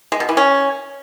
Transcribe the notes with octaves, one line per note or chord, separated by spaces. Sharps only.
G#3
B2
E3
C#4